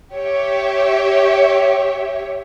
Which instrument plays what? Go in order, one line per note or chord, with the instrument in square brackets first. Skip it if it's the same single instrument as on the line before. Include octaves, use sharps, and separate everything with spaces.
[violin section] G4 C#5 E5